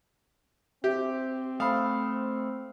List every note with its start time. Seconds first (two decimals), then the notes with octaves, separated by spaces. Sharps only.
0.84 C4 G4 E5
1.60 A3 C5 F5 B5 D#6